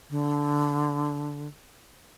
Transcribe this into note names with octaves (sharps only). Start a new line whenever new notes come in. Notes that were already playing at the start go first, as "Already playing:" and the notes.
D3